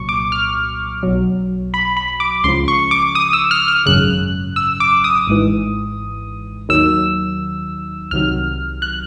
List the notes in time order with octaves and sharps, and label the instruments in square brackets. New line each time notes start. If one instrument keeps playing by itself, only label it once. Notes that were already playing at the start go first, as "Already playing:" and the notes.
Already playing: [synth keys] C2 A#2 F#3 C#6
D6
F6
B1 B2 F#3
B5
B5
D6
C#2 C#3 F3 C6
C#6
D6
D#6
E6
F6
F6
G#1 F#2 C#3 F#6
E6
D6
D#6
G#1 G#2 E3
D#2 D#3 F#3 E6
C2 C3 D#3 F#3 F6
F#6